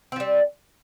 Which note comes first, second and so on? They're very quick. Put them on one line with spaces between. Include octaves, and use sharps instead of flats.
C4 F3 G3